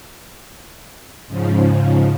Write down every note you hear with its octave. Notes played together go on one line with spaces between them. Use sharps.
G#2 C#3 F3